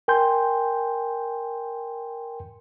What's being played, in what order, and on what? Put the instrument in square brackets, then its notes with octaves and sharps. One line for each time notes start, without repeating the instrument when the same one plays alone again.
[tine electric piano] A#4 G5 G#5 C6 G6